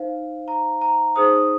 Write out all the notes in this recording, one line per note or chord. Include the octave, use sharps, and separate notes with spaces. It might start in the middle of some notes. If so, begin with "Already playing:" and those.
Already playing: D#4 C5 F5
A#5
A#5
D#4 G#4 C5 D#6